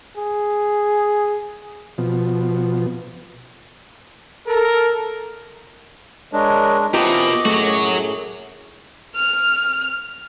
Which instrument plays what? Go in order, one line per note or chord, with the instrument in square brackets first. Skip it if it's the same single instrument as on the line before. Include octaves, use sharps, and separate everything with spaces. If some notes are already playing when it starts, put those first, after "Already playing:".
[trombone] G#4
[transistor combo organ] B2 F3
[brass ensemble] A4 A#4
[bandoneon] G#3 D4 [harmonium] A#4 C#5 D#5
[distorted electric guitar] B2 [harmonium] E3 C4 [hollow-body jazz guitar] F4 G4 A#4 [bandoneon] D#5 D6
[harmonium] F#2 A2 G#4 [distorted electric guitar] F#3 F#4 [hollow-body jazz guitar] A3
[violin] F6